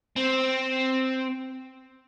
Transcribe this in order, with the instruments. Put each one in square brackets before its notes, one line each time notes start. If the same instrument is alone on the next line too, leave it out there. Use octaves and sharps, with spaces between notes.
[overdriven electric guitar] C4